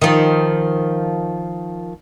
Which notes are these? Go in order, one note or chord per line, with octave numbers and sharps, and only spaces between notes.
D#3 F3